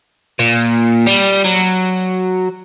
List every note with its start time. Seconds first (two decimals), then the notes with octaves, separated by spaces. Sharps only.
0.39 A#2
1.07 G3
1.44 F#3